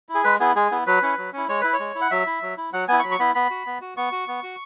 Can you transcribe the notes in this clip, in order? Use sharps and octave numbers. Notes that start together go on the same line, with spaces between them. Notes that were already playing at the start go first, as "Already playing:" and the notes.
E4
G#4
G#3 B4
B3 E4 G#4
G#3 G#4
B3 E4
F#3 B4
C#4 E4
F#3
C#4 E4
G#3 C#5
E4 B4
C#5
G#3
E4
F#5
F#3 E5
E4
F#3
E4
F#3 F#5
B3 E4 G#5
C#6
F#3 B5
C#6
B3 E4 B5
B3 B5
F#4
B3
F#4
B3 C#6
F#4
B3
F#4